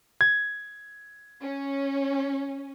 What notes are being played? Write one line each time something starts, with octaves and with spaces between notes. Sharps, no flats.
G#6
C#4